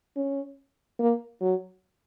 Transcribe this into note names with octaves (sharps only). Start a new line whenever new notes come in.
C#4
A#3
F#3